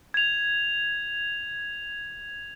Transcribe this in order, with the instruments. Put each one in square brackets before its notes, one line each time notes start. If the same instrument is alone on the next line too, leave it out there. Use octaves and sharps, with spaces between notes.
[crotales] G#6 F7